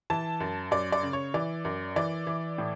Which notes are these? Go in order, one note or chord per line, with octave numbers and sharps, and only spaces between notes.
E3 A5
F#2
F#2 D5
D5
C#3
C#5
E3 D5
F#2
E3 D5
E3
A2